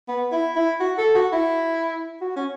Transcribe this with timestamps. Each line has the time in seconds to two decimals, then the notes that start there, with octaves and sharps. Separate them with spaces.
0.08 B3
0.32 E4
0.56 E4
0.80 F#4
0.98 A4
1.15 F#4
1.33 E4
2.21 F#4
2.36 C#4